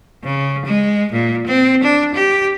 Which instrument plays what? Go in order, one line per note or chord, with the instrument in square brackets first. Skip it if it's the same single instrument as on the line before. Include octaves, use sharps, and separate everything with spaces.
[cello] C#3
G#3
A#2
C4
D4
G4